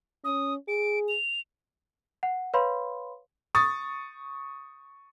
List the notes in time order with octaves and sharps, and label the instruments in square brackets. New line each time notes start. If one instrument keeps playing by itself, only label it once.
[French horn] C#4 [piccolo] D#6
[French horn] G#4 [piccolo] D7
[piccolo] F7
[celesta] F#5
B4 C#5 F5 B5 C6
[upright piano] C#6 D#6 A6